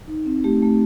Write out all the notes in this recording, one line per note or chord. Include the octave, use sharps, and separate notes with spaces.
D#4
C4
A3 G4
A3